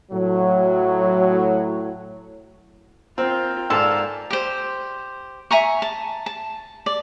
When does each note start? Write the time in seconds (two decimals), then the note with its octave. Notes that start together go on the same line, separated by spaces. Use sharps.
0.12 A2 F#3
3.18 C4 F4 A#4 G5
3.70 G#2 A4 D5 F5 A5
4.30 G4 C5
5.51 E5 G#5 A#5 C#6
5.82 A5
6.26 A5
6.86 D5